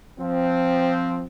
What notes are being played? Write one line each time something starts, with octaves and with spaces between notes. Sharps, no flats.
F3 C4